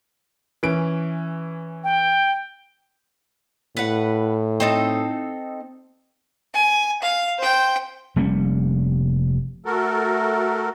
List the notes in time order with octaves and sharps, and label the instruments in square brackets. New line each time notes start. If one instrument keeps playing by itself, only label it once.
[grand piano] E3 C#4 D7
[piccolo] G5
[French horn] A2 [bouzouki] B4 F#5
[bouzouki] C4 D#4 A4
[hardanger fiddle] G#5
F5
C5 G5
[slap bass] F1 G3 A#3 C#4
[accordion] A3 F#4 A4 A#4